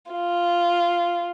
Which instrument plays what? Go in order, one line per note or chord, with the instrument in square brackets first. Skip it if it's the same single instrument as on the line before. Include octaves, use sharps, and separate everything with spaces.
[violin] F4